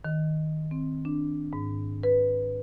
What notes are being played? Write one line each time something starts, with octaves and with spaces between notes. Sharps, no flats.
D#3
C4
D4
G#2
B4